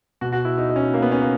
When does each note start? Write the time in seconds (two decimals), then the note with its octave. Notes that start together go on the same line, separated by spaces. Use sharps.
0.21 B2 F#4
0.32 F#4
0.45 E4
0.58 D#4
0.70 D#4
0.76 C#4
0.94 A#3
1.02 B3
1.12 C#4
1.21 A#3